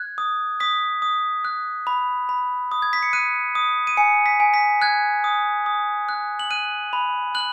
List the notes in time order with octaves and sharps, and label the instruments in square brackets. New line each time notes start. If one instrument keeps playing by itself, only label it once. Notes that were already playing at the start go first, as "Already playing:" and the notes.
Already playing: [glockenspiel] F#6 G#6
D#6
D#6 B6
D#6
F#6
B5
B5
D#6
G#6
B6
C#7
F#6 D#7
D#6
D#7
G#5 C#7
B6
G#5
B6
F#6 G#6
D#6
D#6
F#6
F#7
F#6 D#7
B5
F#6 F#7